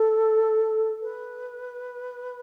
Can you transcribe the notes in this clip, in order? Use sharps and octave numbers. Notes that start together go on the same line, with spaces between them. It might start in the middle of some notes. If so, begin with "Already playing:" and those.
Already playing: A4
B4